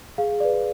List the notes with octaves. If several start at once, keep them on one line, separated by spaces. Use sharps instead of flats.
G#4 F5
B4 D5